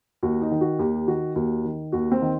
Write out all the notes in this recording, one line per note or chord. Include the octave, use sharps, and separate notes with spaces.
D#2 F#4
D#4
D#3
F#4
D#2 G4
D#3 F#4
D#2 F#4
D#3
D#2 F#4
C4
D#3